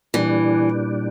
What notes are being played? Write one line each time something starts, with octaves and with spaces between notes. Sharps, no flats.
A#2 E3 G3 D4